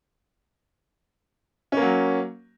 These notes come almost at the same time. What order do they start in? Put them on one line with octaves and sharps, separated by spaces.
C#4 A#3 F#3